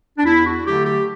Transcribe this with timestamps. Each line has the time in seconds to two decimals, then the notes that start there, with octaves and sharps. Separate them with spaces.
0.18 D4
0.25 E2 E4
0.45 F#4
0.66 D3 F#3 A3 G4
0.86 G4